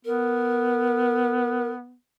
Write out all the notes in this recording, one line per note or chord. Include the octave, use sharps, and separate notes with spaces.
B3 A#4